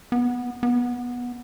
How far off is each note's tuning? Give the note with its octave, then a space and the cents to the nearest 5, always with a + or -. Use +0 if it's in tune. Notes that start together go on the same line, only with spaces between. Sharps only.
B3 -10
B3 -15